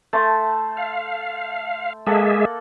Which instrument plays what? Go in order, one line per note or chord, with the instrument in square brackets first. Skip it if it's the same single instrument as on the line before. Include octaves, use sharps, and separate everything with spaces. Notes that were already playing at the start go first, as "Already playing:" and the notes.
[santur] A3 C5 A5
[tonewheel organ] F5
[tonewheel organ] G#3 G#4 E5 [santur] A#3 A4 F#5